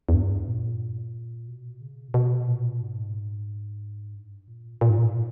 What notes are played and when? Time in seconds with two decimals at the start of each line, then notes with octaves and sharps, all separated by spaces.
0.09 E2
0.14 G2
0.48 A#2
1.48 B2
1.81 C#3
2.08 A#2
2.14 B2
2.48 A#2
2.82 G#2
4.15 G2
4.48 A#2
4.81 A#2
4.90 G#2
4.98 A#2